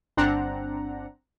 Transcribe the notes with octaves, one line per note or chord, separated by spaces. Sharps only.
G1 C4 D4 F#5 A#5